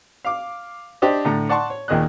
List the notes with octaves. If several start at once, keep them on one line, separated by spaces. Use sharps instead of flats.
F5 D6
D4 G4 C5 D#5
A2 D3 A#5
D5 F#5 A5 C6 C#6
C#5
D#2 A#2 D#3 G#4 D#5 F#6